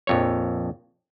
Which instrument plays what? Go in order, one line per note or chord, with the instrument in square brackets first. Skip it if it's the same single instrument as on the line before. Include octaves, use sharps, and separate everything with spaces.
[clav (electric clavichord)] A#1 F2 C#5